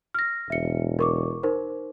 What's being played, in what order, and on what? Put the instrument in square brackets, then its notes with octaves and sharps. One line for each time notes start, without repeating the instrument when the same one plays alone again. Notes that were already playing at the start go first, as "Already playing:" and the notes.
[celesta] F6 A#6
[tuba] E1 [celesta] E5 C#7
[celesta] A#4 C#6 D6
D#4 A#4 C5